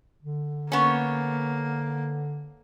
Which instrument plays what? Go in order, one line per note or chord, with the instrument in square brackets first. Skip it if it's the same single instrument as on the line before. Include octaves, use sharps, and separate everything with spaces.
[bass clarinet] D3
[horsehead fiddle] A#3 [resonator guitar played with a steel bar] B3 C#4